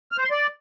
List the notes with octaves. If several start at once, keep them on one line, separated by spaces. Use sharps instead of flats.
F6
C5
C6
D5